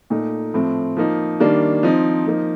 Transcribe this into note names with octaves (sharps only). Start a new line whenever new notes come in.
A#2 A3 D#4
A2 F3 C4
F3 A#3 D#4
D#3 G3 A#3 D4
F3 C4 D#4
F3 A#3 D#4